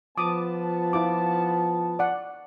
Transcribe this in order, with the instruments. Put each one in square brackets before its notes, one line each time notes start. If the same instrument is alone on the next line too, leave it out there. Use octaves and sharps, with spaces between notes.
[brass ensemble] F3 B3 A5 [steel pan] D6 D#6
[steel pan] E4 F4 D6
D5 F#5